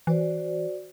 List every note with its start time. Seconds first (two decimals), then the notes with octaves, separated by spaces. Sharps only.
0.07 E3 F#4 C5 D5